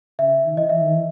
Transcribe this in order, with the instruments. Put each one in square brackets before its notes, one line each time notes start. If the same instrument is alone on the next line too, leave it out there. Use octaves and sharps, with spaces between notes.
[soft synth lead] C#3 [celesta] E5
[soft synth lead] D#3
[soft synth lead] E3 [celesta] D#5
[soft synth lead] E3 [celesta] E5
[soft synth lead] D#3
E3